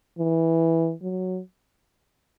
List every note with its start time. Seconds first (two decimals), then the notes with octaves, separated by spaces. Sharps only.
0.19 E3
1.02 F#3